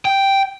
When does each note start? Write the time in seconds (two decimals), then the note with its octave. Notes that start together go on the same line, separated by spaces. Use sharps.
0.05 G5